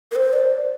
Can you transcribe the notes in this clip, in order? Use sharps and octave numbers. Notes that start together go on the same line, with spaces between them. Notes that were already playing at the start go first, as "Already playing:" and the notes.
A#4
C5
D5